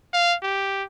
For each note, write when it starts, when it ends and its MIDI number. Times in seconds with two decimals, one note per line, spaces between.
0.13 0.35 77
0.43 0.83 67